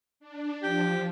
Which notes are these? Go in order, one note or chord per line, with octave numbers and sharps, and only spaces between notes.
D4
F3 G4